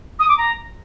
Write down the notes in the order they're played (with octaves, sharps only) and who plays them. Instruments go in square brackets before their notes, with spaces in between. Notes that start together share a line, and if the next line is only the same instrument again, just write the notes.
[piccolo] D#6
D6
A#5